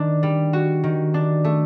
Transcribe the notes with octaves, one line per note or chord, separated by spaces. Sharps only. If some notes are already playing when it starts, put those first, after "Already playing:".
Already playing: D#3 D4
G3
F#4
D#3
D4
A3